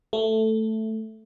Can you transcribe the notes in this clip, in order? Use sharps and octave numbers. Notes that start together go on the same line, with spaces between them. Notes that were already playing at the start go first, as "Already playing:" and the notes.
A3